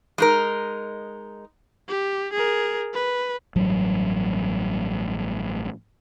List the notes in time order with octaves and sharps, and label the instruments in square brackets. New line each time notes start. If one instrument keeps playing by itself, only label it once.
[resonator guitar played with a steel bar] G#3 D#4 A#4
[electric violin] G4
G#4 A#4
B4
[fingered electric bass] A1 G2 F#3